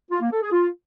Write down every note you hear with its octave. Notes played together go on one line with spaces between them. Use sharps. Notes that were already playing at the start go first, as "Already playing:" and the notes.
F4
A#3
A4
G#4
F4